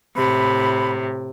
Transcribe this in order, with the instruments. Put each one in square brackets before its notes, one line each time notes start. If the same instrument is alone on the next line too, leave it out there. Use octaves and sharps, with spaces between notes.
[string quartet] A2 C3 [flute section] B5